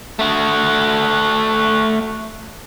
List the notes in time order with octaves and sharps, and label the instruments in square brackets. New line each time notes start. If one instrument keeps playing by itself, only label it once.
[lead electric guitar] A3 F#4